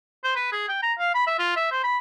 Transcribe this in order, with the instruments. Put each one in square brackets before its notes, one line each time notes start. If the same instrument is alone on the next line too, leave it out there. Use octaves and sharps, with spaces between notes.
[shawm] C5
B4
G#4
G5
A#5
F5
B5
E5
F4
E5
C5
B5